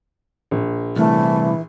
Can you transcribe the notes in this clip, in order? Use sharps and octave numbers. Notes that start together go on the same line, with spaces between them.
A#1
C2 E3 A3